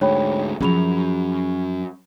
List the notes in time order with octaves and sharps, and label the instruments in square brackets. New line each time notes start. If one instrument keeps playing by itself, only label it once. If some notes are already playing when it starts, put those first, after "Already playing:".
[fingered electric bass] D2 G#2 [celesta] C#5 G5 B5
[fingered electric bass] F#2 [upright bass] F3 C#4 [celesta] G#4 B5 F7